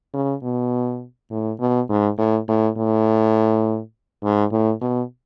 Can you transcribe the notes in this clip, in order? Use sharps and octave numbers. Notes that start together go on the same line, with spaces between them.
C#3
B2
A2
B2
G#2
A2
A2
A2
G#2
A2
B2